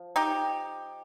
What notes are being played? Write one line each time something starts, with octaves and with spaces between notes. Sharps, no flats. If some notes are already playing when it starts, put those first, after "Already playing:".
Already playing: F3
D#4 G4